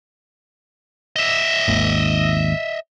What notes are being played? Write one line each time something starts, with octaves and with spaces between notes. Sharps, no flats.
D#5 E5
G#1 D#2